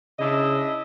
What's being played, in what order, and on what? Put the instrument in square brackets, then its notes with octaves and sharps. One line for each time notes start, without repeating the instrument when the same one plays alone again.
[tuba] C#3 [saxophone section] D4 E4 D#5